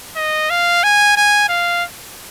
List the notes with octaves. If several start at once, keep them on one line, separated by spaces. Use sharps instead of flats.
D#5
F5
G#5
G#5
F5